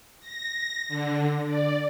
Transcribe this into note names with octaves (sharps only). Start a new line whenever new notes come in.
A#6
D3
D5